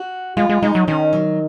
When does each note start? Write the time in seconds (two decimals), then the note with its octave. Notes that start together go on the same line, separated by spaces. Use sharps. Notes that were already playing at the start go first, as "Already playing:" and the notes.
Already playing: F#4
0.37 G#3 F4
0.49 G#3
0.62 G#3 D#4
0.75 F#3
0.88 D#3 C#4
1.13 F#3